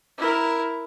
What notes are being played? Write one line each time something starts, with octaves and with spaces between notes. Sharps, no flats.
E4 A#4